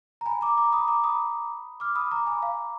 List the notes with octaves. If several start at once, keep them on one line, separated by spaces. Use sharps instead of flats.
A#5
G#5 B5
A#5 D6
A#5 D6
B5 D#6
A#5 D6
B5 D#6
D6 F6
B5 D#6
A#5 D6
G#5 B5
F5 G#5